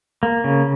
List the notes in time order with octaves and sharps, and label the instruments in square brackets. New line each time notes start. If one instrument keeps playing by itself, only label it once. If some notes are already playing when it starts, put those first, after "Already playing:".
[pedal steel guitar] A#3
C#3